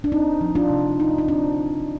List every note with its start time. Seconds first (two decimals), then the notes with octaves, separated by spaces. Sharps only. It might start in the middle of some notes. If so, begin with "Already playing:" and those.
0.04 D4
0.12 C4 D#4
0.41 F3
0.55 D4 F4
0.70 C3
0.99 C3 D#4
1.18 D#4
1.28 C4 D4